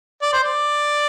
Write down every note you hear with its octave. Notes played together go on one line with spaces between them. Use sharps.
D5
C5
D5